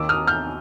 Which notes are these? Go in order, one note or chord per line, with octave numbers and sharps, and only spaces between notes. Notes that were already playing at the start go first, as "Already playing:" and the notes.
Already playing: D#2 D#3 D6 E6
D#6 F6
F6 G6